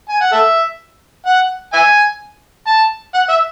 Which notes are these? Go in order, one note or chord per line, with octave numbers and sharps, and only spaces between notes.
G#5
F#5
A4 E5
F#5
E5 G#5
A5
F#5
E5